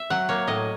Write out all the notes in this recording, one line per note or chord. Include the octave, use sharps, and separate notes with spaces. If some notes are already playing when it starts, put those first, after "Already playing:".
Already playing: E5
F#3 F#5
A#3 C#5
A2 D#5